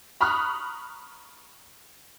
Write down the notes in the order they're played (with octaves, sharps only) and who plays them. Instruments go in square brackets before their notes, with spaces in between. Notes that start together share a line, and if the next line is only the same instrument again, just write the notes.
[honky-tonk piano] A#5 B5 C#6 D#6 F6 F#6